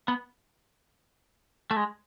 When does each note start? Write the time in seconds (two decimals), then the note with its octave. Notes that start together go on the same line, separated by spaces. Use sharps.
0.08 B3
1.71 A3
1.76 G#3